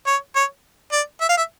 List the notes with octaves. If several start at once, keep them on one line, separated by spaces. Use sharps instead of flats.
C#5
C#5
D5
E5
F5
E5